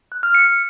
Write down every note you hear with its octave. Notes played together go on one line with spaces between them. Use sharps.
F#6
F6
C#7